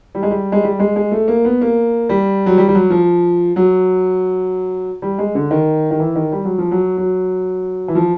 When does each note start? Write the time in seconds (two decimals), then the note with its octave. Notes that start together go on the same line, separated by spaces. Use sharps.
0.15 G3
0.23 G#3
0.31 G3
0.52 G#3
0.63 G3
0.79 G#3
0.96 G#3
1.11 A3
1.28 A#3
1.45 B3
1.61 A#3
2.09 G3
2.46 F#3
2.58 G3
2.68 G3
2.75 F#3
2.90 F3
3.56 F#3
5.02 G3
5.18 G#3
5.35 D3
5.51 D#3
5.91 D#3
6.00 E3
6.16 D#3
6.32 G3
6.45 F#3
6.58 F3
6.71 F#3
6.97 F#3
7.88 E3
7.95 F3